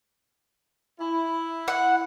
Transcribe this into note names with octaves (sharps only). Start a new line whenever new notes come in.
E4
F#5